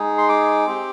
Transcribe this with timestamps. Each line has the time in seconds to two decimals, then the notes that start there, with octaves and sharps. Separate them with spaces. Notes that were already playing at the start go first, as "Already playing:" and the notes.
Already playing: G#3 D#4 G#4
0.18 C6
0.29 D6
0.66 C4 G4